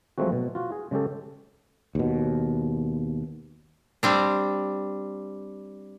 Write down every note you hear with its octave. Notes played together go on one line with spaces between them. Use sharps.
F3 F#3 G#3 A3 C4 F#4
B2
F4 F#4
G#4
C#3 G#3 C#4 G4 A4
D#2 B2
G3 C4 D4